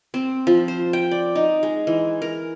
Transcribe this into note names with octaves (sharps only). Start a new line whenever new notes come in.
C4
F3
C5
G5
D5
D#4
G#3
E3
A#4